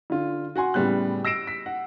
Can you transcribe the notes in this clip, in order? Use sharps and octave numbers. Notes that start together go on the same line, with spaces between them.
D3 F4
F#4 F#5 G#5 C6
A2 C#3 G3 B3 F#6
E6 A#6 C7 D7 E7
B6
F#5